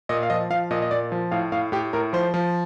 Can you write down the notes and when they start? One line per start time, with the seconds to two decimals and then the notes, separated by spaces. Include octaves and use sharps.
0.09 A#2 D#5
0.23 F5
0.30 F3 D#5
0.50 F3 F5
0.71 A#2 D#5
0.82 D#5
0.91 A#2 D5
1.12 F3
1.31 A2 F5
1.52 A2 F5
1.72 A2 G4
1.93 A2 A#4
2.13 F3 C5
2.34 F3